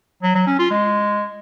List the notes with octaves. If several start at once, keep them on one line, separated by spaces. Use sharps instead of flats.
F#3
F#3
C#4
F4
G#3